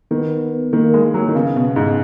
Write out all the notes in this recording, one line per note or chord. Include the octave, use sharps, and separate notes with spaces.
D#3 B3
D#3 A#3
G#3
F#3
D#3
C#3 B3
B2
G#2